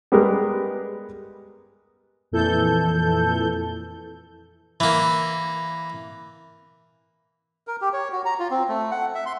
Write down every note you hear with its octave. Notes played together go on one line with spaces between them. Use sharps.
G3 G#3 B3 G#4 A#4
F2 A#2 E3 A4 G6
E3 A#3
A#4
G4
C#5
F#4
A#5
F4
C4
A3
F#5
E5
C6